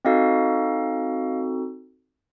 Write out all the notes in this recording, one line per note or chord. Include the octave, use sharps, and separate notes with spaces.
C4 D#4 F#4 A4 D#5 F5